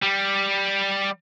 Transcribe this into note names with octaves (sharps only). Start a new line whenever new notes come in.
G3